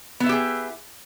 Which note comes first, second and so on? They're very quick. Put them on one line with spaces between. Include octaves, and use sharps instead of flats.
B3 E4 E5 G4 G#4